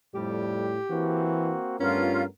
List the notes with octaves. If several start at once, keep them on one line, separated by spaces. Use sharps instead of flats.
F2 A2 G3 G4
E3 A#3 C4 F#4
G2 A3 B3 C#4 F4 A#4